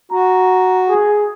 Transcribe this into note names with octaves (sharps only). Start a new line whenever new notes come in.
F#4 A#5
G#4